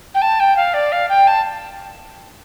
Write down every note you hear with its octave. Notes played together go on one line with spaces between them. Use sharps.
G5
A5
G5
F5
D5
F5
G5
A5